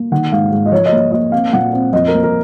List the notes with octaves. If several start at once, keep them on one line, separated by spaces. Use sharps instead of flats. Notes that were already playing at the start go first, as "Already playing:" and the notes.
Already playing: A#3
D#3 F#5
G#2 F5
G#2
D#5
F3 C#5
D#5
A#3 C#5
A#3 D#5
C4 F5
A#2 F#5
C4
F2 D#5
A#4
A#3
A#4